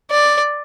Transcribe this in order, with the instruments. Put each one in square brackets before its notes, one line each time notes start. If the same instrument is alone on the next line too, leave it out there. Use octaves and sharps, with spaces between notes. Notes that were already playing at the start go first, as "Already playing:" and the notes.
[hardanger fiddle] D5